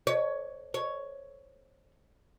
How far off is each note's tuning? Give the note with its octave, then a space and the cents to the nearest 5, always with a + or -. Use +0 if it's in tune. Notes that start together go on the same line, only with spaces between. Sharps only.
C#5 +10
C#5 +5